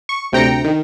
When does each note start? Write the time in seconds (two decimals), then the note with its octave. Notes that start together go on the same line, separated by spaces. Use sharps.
0.09 C#6
0.32 D2 C3 G5 A#5 A#6 C#7
0.65 D#3